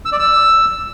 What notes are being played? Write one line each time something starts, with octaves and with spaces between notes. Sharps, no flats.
E6
D5
E6